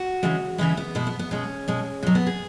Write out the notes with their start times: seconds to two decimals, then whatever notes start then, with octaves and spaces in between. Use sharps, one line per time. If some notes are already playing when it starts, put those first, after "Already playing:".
Already playing: F#4
0.23 C#3 E3 G#3
0.58 C#3 E3 G#3 E4
0.77 B3
0.95 B2 G#3 E4
1.07 B3
1.19 B3
1.31 B2 G#3 C#4
1.68 B2 G#3
2.03 B2 F#3 G#3
2.15 B3
2.27 G#4